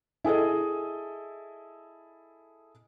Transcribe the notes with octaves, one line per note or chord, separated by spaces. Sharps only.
E4 G#4 A4 D#5